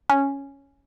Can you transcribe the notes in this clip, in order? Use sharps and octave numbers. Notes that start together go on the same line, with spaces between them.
C#4